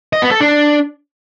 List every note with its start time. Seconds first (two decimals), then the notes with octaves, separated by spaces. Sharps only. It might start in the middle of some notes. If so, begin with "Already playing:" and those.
0.13 D#5
0.22 B3
0.31 A4
0.41 D4